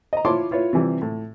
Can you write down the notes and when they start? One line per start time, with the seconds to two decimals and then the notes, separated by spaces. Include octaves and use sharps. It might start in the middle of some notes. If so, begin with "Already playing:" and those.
0.13 D#5 A#5
0.25 E4 F4 C#5 A5 C6 D6
0.51 E4 F4 B4 C#5
0.73 C3 E3 G3
1.02 A2